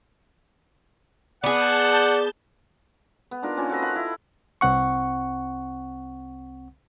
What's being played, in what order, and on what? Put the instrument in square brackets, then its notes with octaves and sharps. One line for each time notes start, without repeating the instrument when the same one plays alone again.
[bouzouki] B3 G#4 [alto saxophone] D5 [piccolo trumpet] F#5 [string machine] A5 G6
[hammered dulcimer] B3
D4 D#4 F4 A#4
A#3 C4 C#4 F4
F#4 A4 B4 D#5
F4 F5 B5 C6
E4
[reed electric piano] C2 C4 F#5 C#6